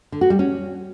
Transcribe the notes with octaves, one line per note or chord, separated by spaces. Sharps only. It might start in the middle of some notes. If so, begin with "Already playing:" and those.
D3
F#4
G3
C#4